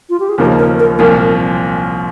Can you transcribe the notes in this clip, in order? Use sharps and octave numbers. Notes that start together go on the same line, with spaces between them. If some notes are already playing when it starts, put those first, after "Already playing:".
F4
G4
G#4
D#2 C#3 F3 A#3 D#4 A#4
A#4
A#4
C2 A#2 F3 A#4